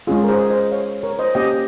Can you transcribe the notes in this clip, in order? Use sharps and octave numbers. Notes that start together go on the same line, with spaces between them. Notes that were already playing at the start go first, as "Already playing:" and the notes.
G#3 C#4 F4 G#4
A#4
G#4 C5
C5 D#5
C#5 F5
A#4 C#5
C5 D#5
A#3 C#4 G4 D#5 G5